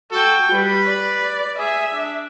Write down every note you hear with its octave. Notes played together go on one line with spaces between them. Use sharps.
F#4 A4 G5
G3 B4
D5
G#4 E5
D4